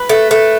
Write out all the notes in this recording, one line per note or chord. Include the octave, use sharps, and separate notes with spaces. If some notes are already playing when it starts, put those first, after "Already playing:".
Already playing: B4
A3
A3